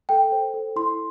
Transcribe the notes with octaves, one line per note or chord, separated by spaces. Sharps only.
A4 G5
C5
A4
E4 C6